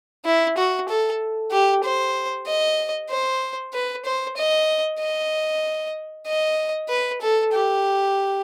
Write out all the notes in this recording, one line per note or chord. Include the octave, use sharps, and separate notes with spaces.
E4
F#4
A4
G4
C5
D#5
C5
B4
C5
D#5
D#5
D#5
B4
A4
G4